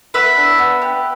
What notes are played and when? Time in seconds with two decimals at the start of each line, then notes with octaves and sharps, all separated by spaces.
0.14 B3 B4 E5
0.37 D4
0.58 B3
0.82 G4